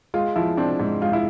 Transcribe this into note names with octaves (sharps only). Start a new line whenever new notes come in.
G#3 F4
F3 E4
C4 D4
G#2
G#3 F4
E4